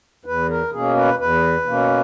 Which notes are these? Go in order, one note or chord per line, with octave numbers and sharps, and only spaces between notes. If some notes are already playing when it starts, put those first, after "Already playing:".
E2 B4
A#4
B2 A#3 C#4 G#4
B4
E2 B4
B2 A#3 C#4